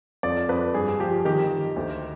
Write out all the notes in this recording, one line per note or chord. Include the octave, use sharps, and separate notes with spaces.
F2 D5
F2 B4
G2 G#4
F3 G4
D#3 G4
D#3
D2